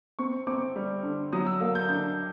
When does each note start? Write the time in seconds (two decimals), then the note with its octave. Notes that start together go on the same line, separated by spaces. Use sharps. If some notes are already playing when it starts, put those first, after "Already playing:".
0.19 C4 C#6
0.47 C4 D6
0.76 G3
1.03 D3
1.33 F#3 D#6
1.47 E6
1.60 A#3
1.75 G6
1.89 D3 G6